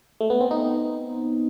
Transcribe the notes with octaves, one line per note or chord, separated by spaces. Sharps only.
A3
B3
C4
D#4